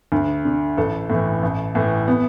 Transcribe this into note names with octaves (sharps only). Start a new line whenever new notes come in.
D2
D3
A1 A4
A2 E3
A1
A2 E3
B3